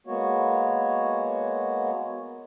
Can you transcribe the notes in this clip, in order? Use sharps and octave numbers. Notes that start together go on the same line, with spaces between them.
G#3 A#3 B3 F#4 C#5